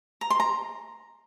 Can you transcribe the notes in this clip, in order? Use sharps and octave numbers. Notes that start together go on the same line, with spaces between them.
A#5
C6
A#5